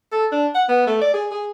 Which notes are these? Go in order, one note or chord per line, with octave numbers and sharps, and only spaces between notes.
A4
D4
F#5
B3
A3
D5
G#4
G#4